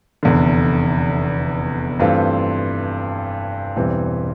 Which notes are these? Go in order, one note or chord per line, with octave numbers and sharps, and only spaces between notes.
F1 E2 D3
G2 E3 A3 C4 F4
E1 E2 E3 G3 C4